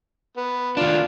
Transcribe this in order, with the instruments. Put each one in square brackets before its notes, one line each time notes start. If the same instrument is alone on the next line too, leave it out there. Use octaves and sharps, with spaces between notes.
[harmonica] B3
[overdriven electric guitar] D#2 D4 [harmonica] F4